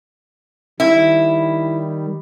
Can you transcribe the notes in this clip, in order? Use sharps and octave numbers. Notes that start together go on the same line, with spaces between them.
D#3 G3 E4